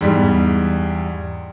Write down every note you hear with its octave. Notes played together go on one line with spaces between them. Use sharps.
E2 G#2 G3